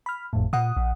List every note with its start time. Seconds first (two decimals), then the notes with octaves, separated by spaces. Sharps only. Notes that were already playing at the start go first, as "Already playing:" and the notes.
0.06 B5 F6
0.33 G#1 F2 A2
0.53 A#2 F#5 D#6
0.77 A#1